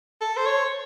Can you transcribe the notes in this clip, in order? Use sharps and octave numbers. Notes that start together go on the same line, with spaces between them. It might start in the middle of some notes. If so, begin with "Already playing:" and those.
A4
C5
C#5